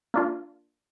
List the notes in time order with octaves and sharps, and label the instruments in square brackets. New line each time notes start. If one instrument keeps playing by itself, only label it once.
[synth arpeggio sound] A#3 D4 F4